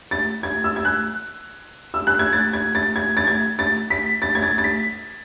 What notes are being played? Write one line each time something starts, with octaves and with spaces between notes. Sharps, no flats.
A6
G#6
E6
G#6
F#6
E6
F#6
G#6
A6
G#6
A6
G#6
A6
G#6
A6
B6
A6
G#6
A6
A6
B6